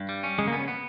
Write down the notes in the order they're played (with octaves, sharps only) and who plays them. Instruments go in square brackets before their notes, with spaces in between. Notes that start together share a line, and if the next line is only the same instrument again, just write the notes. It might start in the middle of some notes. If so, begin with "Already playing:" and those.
Already playing: [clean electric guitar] G2
G3
C#4
[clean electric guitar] C#3 [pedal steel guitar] G#3
[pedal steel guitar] A#3
[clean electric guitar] B3
[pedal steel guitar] C#4
[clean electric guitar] B3